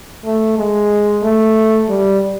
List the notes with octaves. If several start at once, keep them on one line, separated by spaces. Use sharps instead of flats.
A3
G#3
A3
G3